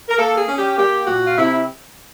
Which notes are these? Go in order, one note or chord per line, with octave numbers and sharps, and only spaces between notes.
A#4
A#3 A4
G#4
C#4
G4
A#3 G4
A#2 F#4
F4
C3 E4